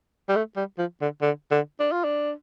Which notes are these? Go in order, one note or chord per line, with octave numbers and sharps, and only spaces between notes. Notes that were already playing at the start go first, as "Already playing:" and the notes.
G3
A3
G3
F3
D3
D3
D3
D4
F4
D4